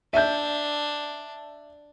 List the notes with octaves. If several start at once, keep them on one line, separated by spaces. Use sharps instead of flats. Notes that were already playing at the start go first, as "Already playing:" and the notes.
D4 E5 G6